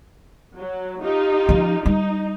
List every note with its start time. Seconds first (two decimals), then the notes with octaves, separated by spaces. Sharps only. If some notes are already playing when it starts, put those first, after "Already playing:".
0.57 F#3
1.02 D#4 F4 G4
1.49 F3 C#4
1.86 G3 D#4